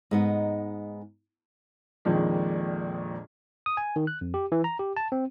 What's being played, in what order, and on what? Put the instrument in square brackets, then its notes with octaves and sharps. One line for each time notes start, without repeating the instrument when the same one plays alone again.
[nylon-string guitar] G#2 B3 D#4
[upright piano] A#1 F2 A#2 D#3 G#3
[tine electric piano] D#6
G#5
D#3
F#6
F2
G4
E3
A#5
G4
A5
C4